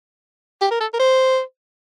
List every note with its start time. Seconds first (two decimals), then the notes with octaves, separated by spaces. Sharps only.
0.61 G4
0.71 A#4
0.80 A4
0.93 A#4
0.99 C5